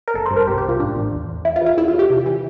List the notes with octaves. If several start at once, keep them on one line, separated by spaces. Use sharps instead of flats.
A#4
G1 A4
C5
G2
A#4
C2 G4
G4
C2
F4
A1 D4
A1
E2
E2
E2 E4
F4
E2
F4
E2 E4
F4
E2
G4
C3
E3